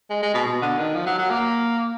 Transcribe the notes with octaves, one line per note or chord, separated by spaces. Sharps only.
G#3
G#3
B2
B2
D3
D#3
F3
F#3
F#3
A#3